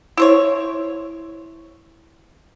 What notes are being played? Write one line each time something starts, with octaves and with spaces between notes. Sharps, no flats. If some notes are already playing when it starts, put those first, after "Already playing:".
E4 C5 C#5